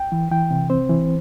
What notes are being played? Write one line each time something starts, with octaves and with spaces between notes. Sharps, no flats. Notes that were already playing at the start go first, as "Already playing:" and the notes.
Already playing: G5
E3
E3 G5
C3
C4 C5
E3